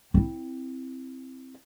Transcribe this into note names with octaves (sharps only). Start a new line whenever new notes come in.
C4 E4